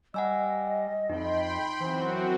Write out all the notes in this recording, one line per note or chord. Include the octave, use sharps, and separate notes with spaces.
G3 D#5 F#5 G#5 E6
F2 D#4 G5 B5 C6
F#2 E3 C4 F#4 C5